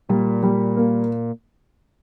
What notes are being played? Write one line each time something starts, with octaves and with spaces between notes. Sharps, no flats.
A#2 G3
G3
A#3